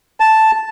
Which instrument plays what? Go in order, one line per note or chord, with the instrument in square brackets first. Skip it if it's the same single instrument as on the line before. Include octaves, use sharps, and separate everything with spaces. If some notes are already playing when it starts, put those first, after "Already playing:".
[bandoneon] A5